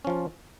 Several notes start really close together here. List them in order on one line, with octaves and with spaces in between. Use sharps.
C#4 F3 F4